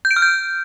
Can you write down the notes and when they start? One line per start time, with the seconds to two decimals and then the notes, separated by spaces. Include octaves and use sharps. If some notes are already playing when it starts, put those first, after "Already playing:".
0.05 G6
0.11 D7
0.16 F6
0.22 G6